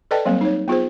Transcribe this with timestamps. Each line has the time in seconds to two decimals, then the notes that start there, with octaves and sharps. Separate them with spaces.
0.11 A4 B4 D5 D#5 G5 A5
0.25 F#3 G3 A#3 C4
0.41 D#4 C#5
0.68 B3 F4 G#4 C5